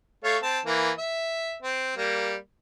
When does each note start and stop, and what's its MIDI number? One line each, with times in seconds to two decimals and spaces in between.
0.24 0.37 57
0.24 0.37 73
0.24 0.37 77
0.43 0.59 60
0.43 0.59 81
0.65 0.91 52
0.65 0.91 58
0.98 1.56 76
1.62 1.94 60
1.96 2.35 55
1.96 2.35 58